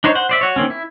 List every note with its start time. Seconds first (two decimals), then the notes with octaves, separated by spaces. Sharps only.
0.04 D4 D#4 C5 C#5
0.15 C5 F#5
0.29 C5 D5 E5
0.41 F#4 C#5
0.56 D#3 A#3 C4 C#4
0.70 E4